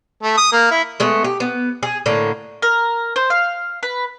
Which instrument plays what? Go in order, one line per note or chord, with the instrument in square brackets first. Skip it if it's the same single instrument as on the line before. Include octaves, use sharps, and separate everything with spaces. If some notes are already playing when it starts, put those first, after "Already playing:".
[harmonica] A3
D#6
A#3
E4
[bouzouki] G#3 A3 B3
G4
B3
G#4
A2 D3 A#3
[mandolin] A#4
C5
F5
B4